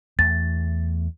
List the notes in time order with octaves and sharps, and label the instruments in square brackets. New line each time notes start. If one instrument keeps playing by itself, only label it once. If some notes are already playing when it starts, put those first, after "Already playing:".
[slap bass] E2 E3 A3 [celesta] A6